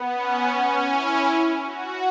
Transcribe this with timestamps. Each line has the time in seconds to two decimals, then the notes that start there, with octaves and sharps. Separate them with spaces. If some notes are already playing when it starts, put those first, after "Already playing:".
Already playing: B3
0.13 C#4
0.51 C#4
0.88 E4
1.63 F#4